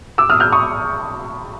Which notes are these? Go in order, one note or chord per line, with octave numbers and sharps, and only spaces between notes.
D6 E6
D#6 F6
F6 G6
C#6 D#6